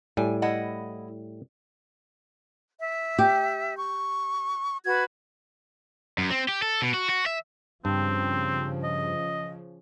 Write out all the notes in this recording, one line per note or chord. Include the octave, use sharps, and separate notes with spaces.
A2 G3 G#5
E4 D#5 F#5
E5
G4
C#6
F#4 B4 G#6
F#2
C4
G4
A4
B2
F#4
F#4
E5
G2 C#3 F3 C4
D#5